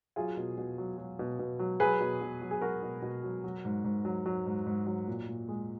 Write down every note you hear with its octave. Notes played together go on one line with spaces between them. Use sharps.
F#3 F4 G#4
B2
B2
F#3
F#3
B2
B2
F#3
F#3 G#4 B4
B2
B2
F#3
G#4
F#3 F#4 A#4
B2
B2
F#3
F#3
G#2
G#2
F#3
F#3
G#2
G#2
F#3
A#2
A#2
G#3